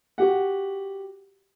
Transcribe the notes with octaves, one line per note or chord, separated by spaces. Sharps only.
F#4 G4 F#5